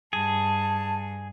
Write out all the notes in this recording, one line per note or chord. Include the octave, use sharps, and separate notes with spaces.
G2 G#4 A5